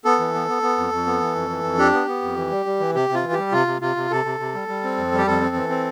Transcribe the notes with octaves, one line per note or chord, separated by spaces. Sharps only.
B3 A4
E3
B3
B3
B3
F2
F2
B3
E3
F2
E3
F2
D4 G4
B3
B3
F2
E3
G3
G3
E3
C3 G4
C3
F4
E3
G4
G3
C3 F4
C3
C3 F4
C3
C3 A4
C3
C3
G3
G3
C4
F2
G3
G4
F2 A4
C4
E3
C4